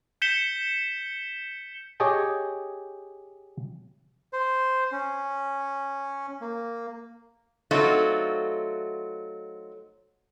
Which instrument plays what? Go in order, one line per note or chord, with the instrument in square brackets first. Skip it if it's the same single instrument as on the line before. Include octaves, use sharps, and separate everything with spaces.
[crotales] G6 B6 C#7 E7 G7
[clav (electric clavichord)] G4 G#4 C#5 D#5 G5 A5
[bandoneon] C5
C#4
A#3
[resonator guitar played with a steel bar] F#3 A3 C4 D#4 F4 F#4